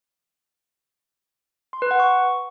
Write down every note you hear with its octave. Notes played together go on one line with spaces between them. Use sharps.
C6
B4
F#5
C#6